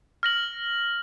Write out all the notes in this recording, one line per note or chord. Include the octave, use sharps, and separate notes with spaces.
F6 A#6 F#7